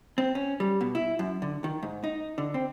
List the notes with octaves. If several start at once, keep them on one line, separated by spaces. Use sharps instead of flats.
C4
C#4
G3
B2
E4
F#2
D3
D#3
G#2
D#4
D3
C4